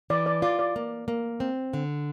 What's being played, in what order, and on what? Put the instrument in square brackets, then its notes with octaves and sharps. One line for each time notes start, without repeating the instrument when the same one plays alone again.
[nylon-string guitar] E3 [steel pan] D5
[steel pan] D5
[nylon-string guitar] F4 [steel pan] D5
[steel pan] D5
[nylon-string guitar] A#3
A#3
C4
D3